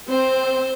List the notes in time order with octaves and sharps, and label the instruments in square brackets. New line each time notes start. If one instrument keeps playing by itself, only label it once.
[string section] C4 [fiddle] C5